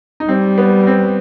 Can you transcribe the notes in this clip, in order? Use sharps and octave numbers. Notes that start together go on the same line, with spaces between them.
D#4
G3 C4
B3
C4